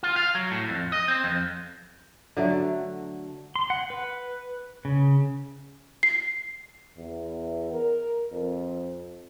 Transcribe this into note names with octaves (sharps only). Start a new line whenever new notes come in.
F4
F5
F#3
A2
F2
D#5
C4
F2
D3 F#3 A3
C6
F#5
B4
C#3
C7
E2
A#4
F2